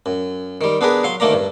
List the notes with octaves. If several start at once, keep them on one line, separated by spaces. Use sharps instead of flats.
F#2
D#3 G3
B3 D4 G#4 A#4 B4
F#3 F5 C6
D2 D#3 A3 A#3 D5 A#5
G2